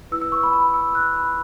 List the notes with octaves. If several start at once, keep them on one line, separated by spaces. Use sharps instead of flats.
E4 B4 E6
E6
C#6
B5
B5
E6
F#6
B5